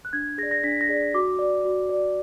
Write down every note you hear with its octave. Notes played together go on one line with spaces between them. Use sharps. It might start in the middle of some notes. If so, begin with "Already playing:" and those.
F#6
D4 G#6
G#4 D5 A#6
A#6
D4 B6
A#6
G#4 D5
F#4 D6
D5
F#4
D5